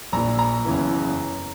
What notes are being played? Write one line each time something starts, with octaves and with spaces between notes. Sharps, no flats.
A#1 A#2 A#5
A#5
F#1 E2 C#3 E3